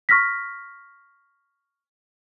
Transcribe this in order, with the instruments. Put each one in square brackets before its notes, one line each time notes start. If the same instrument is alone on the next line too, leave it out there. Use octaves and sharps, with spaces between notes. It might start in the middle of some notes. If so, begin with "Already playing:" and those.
[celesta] C#6 F6 A#6 B6